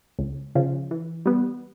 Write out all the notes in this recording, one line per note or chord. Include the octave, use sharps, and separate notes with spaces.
C#2
C#3 F3
E3
G3 B3